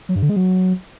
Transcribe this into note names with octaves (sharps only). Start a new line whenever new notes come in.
F#3
G2
D3
G#3
F#3